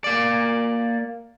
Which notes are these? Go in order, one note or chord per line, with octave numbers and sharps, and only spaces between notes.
A#3 D5